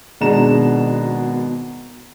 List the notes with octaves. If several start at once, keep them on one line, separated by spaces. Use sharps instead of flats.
G#1 B2 G#3 D4 A#5 E7